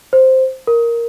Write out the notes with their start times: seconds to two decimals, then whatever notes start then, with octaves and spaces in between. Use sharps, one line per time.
0.13 C5
0.67 A#4